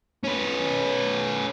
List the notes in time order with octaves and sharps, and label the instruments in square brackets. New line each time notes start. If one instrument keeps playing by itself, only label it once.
[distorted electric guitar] C#4 B4